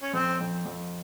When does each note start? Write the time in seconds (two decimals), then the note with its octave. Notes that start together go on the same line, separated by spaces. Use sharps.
0.02 C#4
0.13 F2 C4
0.40 F2
0.66 F2